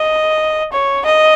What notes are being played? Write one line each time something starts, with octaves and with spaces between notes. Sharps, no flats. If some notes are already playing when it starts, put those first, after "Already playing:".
Already playing: D#5
C#5
D#5